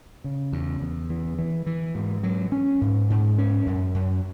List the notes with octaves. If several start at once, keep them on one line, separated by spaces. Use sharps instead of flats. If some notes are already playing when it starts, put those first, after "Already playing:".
C#3
E2
E2
E3
E3
E3
G#2
F#3
C#4
G#2
G#2
C#4
F#2
F#2